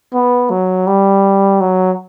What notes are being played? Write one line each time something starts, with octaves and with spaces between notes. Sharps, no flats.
B3
F#3
G3
F#3